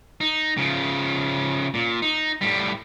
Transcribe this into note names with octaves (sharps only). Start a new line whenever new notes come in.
D#4
C#3 F3
A#2
D#4
A2 G3